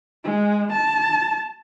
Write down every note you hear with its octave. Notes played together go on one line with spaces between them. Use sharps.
G#3
A5